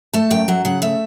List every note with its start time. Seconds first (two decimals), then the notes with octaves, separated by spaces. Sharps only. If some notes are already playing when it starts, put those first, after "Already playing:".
0.13 A3 A5
0.31 F#2 G5
0.48 F#3 F#5
0.65 C#3 F#5
0.82 A3 E5